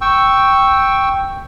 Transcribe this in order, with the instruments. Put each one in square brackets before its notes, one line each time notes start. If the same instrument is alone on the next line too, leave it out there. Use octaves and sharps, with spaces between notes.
[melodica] G5 C#6 E6